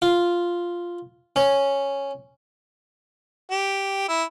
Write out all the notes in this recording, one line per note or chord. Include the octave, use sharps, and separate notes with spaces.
F4
C#4
G4
E4